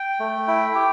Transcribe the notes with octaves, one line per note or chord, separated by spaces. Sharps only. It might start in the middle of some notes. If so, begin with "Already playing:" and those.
Already playing: G5
A3
E4
G4